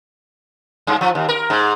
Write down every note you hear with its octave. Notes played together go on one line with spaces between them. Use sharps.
G2
F3
D#2
A#4
G#2